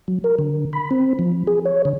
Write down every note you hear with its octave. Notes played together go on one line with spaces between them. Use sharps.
F#3
A#4
D3
B5
C4
F3
G#4
C#5
D3